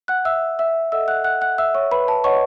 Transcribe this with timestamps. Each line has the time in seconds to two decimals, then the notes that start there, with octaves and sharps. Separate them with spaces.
0.08 F#5 F#6
0.25 E5 E6
0.59 E5 E6
0.92 A4 D#5 E5 F#5 E6
1.08 F#5 F#6
1.24 F#5 F#6
1.41 F#5 F#6
1.58 E5 E6
1.75 C#5 C#6
1.91 B4 B5
2.08 A5
2.24 B4 C#5 D#5 F#5 C#6